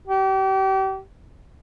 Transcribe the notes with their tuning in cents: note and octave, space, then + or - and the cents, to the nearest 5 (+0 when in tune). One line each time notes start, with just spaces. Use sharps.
G4 -35